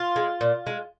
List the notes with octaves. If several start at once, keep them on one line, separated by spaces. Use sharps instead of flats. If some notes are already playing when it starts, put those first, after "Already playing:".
Already playing: F4
G#3
A#2
G#3